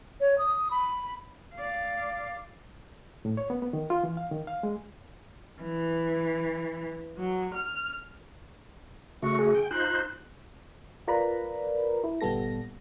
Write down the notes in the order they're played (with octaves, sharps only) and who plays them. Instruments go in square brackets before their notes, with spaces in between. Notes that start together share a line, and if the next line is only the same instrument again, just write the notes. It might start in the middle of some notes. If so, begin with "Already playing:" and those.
[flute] C#5
D#6
B5
[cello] D5 F5
[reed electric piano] A2
C#5
B3
B3
D#3
F4
E3
F5
D#3
F5
G#3
[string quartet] E3
F#3
F6
[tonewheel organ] C#3 A3 F#4 [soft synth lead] C#6
[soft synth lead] G#4
[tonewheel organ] G5
[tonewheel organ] D#4 F4 C5 [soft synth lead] F#6
[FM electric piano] F4 A#4 B4 D5 A#5 B5
E4
G1 A#2 G3 B3 A4 A#6